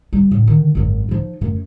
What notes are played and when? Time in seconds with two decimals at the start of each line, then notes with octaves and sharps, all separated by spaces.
0.13 G3
0.31 A2
0.47 D3 D#3
0.75 G#1 F#2
1.09 F3 D#4
1.41 F#2 A3